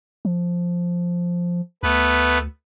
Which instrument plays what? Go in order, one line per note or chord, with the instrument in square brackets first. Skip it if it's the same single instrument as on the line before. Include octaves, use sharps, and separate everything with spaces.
[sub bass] F3
[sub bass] D2 [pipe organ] A3 B3 B4